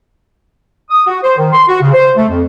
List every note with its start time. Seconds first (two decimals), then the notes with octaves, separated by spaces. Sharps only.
0.91 D#6
1.07 F#4
1.23 C5
1.37 D#3
1.53 C6
1.67 F#4
1.81 C#3
1.93 C5
2.17 A3
2.29 F2